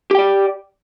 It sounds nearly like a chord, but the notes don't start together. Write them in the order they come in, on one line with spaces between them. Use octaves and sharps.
G4 G5 D5